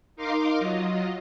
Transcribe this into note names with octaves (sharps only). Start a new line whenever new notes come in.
D#4 A#4 F5 C6 D6
F#3 F4 D#5